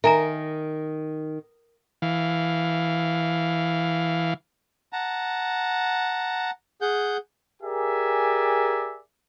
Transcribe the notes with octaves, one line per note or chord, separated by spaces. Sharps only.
D#3 A#4 E5 G#5 A#5
E3 F5
F#5 A5 A#5
G#4 F#5 G6
G4 G#4 A#4 D5 E5 G#5